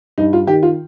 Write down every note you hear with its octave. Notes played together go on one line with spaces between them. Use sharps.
G2 D#4
F4
D#3 G4
F4